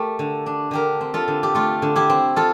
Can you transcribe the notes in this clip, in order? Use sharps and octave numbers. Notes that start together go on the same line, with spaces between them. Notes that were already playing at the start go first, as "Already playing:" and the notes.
Already playing: A3 G4 A#4
D3
D4
D3 G4 A#4
C4
F4 A4
D3
G4
A3 F4
D3
E4 G4
C4
F4 A4